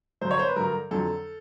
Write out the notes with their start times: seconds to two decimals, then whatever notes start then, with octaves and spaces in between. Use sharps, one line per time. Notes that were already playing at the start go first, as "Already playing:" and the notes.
0.21 G2 D3 F#3 C5
0.31 C#5
0.39 C5
0.48 B4
0.56 G2 D3 F#3 A#4
0.91 F2 D3 F#3 A4